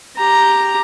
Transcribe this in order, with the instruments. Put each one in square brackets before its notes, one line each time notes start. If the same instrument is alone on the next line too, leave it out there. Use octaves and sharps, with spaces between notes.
[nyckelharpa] G4 A#5